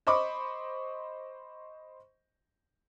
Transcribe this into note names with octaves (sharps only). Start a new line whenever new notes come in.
C5 D#5 B5 C#6 D6